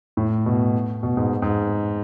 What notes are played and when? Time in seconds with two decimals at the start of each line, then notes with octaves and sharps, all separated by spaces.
0.17 A2
0.46 B2
1.03 B2
1.17 G#2
1.42 G#2